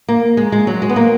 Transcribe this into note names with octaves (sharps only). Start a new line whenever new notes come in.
A#3
G#3
G#3
F#3
G#3
B3
A#3